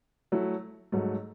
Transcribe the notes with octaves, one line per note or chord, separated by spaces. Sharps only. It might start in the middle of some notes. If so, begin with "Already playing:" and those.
F#3 A3 E4
G#2 F#3 A3